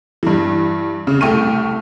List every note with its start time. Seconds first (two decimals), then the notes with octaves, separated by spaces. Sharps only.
0.23 G2 E3
1.07 C#3
1.21 C2 A3 G5 C#6 F6 D#7